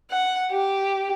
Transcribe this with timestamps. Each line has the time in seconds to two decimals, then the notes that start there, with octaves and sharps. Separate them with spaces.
0.11 F#5
0.51 G4